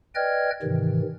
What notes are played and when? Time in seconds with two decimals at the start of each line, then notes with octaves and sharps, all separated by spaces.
0.15 B4 D5 D#5 G5 F6 G#6
0.63 G#2 C3 D#3 E3